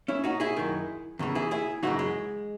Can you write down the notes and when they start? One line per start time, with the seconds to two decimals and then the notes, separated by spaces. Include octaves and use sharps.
0.08 C#4 E4
0.24 D#4 F#4
0.40 E4 G#4
0.56 F#2 D#3
1.19 E2 C#3 E3
1.35 E4 G#4
1.51 E4 G#4
1.83 F#2 C#3 E3 D#4 F#4
1.99 G#3